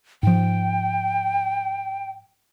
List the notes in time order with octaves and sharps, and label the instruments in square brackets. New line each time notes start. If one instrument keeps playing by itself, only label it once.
[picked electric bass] G#2 F3 [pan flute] G5